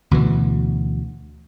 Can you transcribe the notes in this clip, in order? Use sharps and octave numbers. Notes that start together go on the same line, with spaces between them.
D2 B2 E3